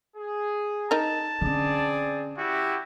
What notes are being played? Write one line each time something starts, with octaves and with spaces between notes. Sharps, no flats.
G#4
D#4 A#4 A5
D3 C4 C#4 G#4 D5
E4 F#4 G4